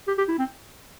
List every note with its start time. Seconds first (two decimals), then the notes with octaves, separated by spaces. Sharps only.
0.07 G4
0.18 G4
0.29 E4
0.39 C4